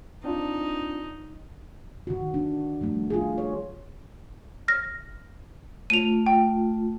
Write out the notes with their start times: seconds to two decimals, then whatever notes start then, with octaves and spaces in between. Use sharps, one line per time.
0.24 C4 D4 D#4 F4
2.07 D#3 F#4
2.34 D4
2.81 F3 G3 A3
3.10 F4 G#4
3.38 C#5
4.68 F6 A#6
5.90 A3 F4 D#7 F7
6.26 G5